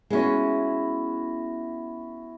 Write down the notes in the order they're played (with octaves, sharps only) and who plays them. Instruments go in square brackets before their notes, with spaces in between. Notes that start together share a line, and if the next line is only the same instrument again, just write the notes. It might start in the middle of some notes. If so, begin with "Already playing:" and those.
[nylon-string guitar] G#3 C#4 [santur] B3 E4 F#4